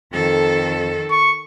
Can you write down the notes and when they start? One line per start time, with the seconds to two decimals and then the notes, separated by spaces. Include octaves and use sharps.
0.13 F2 D#3 A4
1.11 C#6